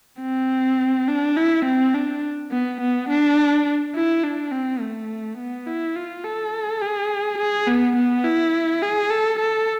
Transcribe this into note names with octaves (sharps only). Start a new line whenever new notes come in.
C4
D4
E4
C4
D4
B3
B3
D4
E4
D4
C4
A3
B3
E4
F4
A4
G#4
G#4
B3
B3
E4
G#4
A4
A4